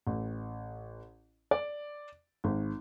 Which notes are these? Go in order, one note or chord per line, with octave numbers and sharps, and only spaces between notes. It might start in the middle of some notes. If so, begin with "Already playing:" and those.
A1
D5
G#1